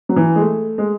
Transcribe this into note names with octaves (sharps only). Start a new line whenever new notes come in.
F#3
E3
G#3
A3
G#3